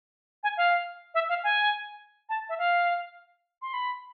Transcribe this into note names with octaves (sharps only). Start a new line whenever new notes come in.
G#5
F5
E5
F5
G#5
A5
E5
F5
C6
B5